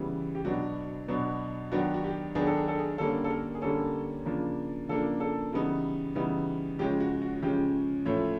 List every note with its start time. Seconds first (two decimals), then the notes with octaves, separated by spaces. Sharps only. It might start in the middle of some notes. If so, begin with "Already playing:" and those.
Already playing: C#3 E3 G3 B3
0.35 G4
0.45 B2 F#3 B3 D4 F#4
1.08 B2 F#3 B3 D4
1.72 D#3 F#3 B3 D4 F#4
1.94 F#4
2.04 G4
2.35 D#3 F#3 B3 D4 G#4
2.47 A4
2.57 G#4
2.68 A4
2.79 G#4
2.98 D3 G3 A#3 C#4 A4
3.24 A4
3.30 A#4
3.55 G#4
3.62 D3 G3 A#3 C#4 A4
4.26 C#3 F3 A#3 D4
4.88 C#3 F3 A#3 D4 A4
5.20 A4
5.53 C#3 E3 G3 B3 D#4
6.15 C#3 E3 G3 B3 D#4
6.79 C#3 F3 G#3 C#4 G4
7.00 F#4
7.22 F#4
7.43 C#3 F3 G#3 C#4 G4
8.05 A2 F3 A3 C#4 C#5